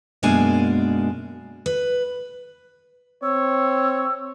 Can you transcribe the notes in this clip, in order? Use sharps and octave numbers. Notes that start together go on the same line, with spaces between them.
F#2 B2 G#3 A#3 D4 G#5
B4
C4 C#5 E6